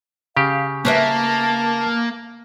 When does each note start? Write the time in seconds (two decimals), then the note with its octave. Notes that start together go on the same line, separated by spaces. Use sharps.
0.37 C#3 G4 F5
0.85 A#3 B4 C5 E5 A5